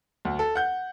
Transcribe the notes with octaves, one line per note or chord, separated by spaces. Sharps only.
D2
A4
F#5 G6